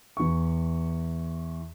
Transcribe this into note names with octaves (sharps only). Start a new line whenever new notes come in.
E2 C#6